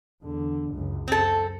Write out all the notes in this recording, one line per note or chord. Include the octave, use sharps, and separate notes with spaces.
E2 D3
C#2 F#2
F#2 C4 A4